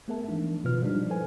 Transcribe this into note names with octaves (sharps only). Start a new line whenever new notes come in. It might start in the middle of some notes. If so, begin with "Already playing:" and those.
A3 B3 G#4 A#4 E5 A5
E3 F3 G#3 D4 D#4
B2 D#3 F4 B4 F6
F3 G3 G#3 D4 D#4
E4 A4 B4 C5 G#5